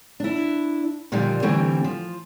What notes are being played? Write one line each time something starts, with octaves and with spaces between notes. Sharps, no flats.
D4 E4
A#2 D3 D#3 F3 G3
D3 E3 G3 A3 C4 D#4
F3